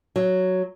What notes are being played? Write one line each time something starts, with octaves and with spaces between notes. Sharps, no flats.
F#3